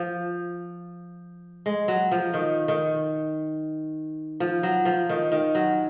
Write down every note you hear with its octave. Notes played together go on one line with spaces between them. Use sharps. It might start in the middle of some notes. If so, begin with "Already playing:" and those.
Already playing: F3
G#3
F#3
F3
D#3
D#3
F3
F#3
F3
D#3
D#3
F#3